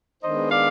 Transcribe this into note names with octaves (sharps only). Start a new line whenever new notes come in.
D#3 G#3 B3 D4 C5 D#5
D5 F5